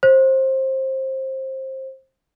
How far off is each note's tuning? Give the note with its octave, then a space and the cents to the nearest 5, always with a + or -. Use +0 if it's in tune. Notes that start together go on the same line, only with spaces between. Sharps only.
C5 +20